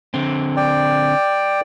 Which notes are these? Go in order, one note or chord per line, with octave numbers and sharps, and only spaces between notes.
D3 C4
D5 G5